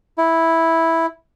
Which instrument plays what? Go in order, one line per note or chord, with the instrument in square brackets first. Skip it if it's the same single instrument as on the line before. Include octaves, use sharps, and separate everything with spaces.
[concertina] E4